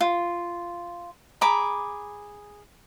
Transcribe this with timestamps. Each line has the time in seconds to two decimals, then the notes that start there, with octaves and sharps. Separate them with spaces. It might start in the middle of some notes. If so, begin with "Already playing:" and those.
0.01 F4
1.41 G#4 A#5 B5 D6